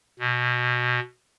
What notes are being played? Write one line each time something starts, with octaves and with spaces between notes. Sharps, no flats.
B2